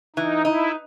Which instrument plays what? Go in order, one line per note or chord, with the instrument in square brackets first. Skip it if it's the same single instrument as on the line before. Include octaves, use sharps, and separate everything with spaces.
[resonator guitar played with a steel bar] E3 [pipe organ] D#4
[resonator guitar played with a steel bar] D#4 [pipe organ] E4